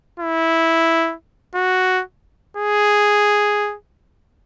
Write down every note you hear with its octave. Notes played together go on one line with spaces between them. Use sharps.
E4
F#4
G#4